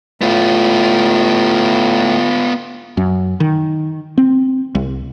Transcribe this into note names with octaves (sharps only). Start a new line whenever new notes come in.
A2 B3 F4
F#2
D#3
C4
C2